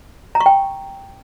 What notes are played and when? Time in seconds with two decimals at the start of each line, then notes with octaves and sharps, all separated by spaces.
0.35 A#5
0.40 C#6
0.46 G5